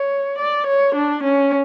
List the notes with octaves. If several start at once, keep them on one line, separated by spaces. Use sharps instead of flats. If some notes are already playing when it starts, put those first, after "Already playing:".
Already playing: C#5
D5
C#5
D4
C#4